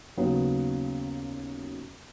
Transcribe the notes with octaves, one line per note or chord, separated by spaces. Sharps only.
D#2 C#3 F#3 B3